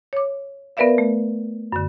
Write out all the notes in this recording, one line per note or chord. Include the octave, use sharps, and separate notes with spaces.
C#5 D6
B3 A#4 B4 D5 E5 F5
A3
F#2 D3